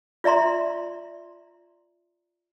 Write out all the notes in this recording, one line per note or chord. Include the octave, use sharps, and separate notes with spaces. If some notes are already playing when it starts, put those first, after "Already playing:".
F4 D5 E5 A#5 C6